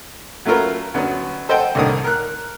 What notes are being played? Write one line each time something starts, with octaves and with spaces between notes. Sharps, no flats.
F#3 A3 C#4 F4 A#4 B4
D2 F#3 B3 C#4
A4 C5 D#5 F#5 G5
C2 A2 D3 D#3 D#6
A#4 F#6